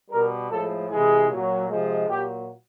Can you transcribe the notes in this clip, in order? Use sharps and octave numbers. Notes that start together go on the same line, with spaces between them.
B2 G3 A#4
A2 F3 G#3 A4
C3 E3 G#3 G#4
A#2 F#3
C3 F3 G#3
A#2 F#3 G4